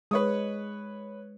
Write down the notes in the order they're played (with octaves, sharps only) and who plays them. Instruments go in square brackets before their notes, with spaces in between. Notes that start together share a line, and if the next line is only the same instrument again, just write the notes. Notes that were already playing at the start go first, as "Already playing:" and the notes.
[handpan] G#3 [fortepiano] B4 C#5 D#6